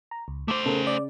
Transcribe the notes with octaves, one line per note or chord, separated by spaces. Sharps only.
A#5
C#2
A3 C5 D6
C#3 A4 A#4
D5